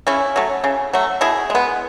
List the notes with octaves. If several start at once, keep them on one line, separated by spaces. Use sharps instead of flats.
C#3 C#4 E4
F#3 A3
C#3
F#3 A3
B2 E4 G#4
G#3 B3